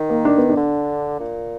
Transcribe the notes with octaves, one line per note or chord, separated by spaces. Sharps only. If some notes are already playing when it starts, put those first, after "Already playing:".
Already playing: D#3
A#3
D4
B3
D4
D3
A#2